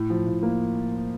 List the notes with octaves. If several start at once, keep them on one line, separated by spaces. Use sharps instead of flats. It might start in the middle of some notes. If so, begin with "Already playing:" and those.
Already playing: A2
F3
A2
A#3